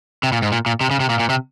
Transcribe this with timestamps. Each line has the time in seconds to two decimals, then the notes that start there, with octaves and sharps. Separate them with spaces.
0.23 C3
0.32 A#2
0.42 G#2
0.52 A#2
0.66 A#2
0.81 C3
0.91 C#3
1.00 C3
1.09 A#2
1.20 A#2
1.29 C3